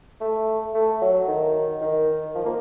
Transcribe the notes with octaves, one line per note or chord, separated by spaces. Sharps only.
A3
A3
F#3
D#3
D#3
F3
A#3